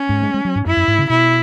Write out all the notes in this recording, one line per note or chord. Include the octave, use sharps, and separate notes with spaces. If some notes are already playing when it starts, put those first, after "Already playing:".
Already playing: C#4
G#2
G#3
G#3
F#3
G#2
F#2 E4
F#2
G#2
C#3
B2 E4